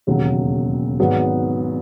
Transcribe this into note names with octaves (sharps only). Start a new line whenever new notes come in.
E1 D#2 C#3 F#3
G#1 G#2 F#3 B3 F#4